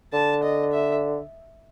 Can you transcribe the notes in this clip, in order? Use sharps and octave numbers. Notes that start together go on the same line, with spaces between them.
D3 A5
D#5
E5